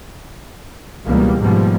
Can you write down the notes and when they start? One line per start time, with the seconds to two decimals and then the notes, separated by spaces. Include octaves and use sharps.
1.06 C#2 B2 E3 G3 A#3
1.41 G#2 B2 F3 G3 A#3